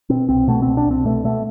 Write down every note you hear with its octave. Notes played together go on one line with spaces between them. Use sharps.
B2 C4
C2 C4
B2 A3
C2 C4
D4
C2 C4
B2 A3
B2 A3